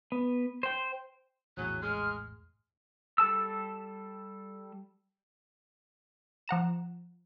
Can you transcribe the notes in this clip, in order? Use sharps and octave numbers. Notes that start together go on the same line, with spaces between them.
B3
C5 G5
A#1 E2 A2 C#3 F#3 C#4 F#6
G#3 F6
G3 A4 A5 E6
F3 F#5 A#5 E7